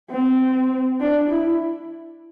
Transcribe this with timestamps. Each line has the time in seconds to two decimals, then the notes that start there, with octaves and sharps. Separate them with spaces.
0.11 C4
1.00 D4
1.30 E4